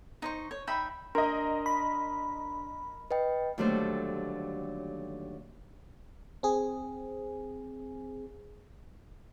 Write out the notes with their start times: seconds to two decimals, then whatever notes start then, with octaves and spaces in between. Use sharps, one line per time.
0.22 D#4 C5 C#6
0.51 C#5
0.67 D#4 E5 G5 B5
1.15 D4 A#4 D#5 A#5 C6
1.66 B5
3.11 B4 D#5 G5
3.58 D#2 D3 F#3 G3 A3 C5
6.43 C4 G#4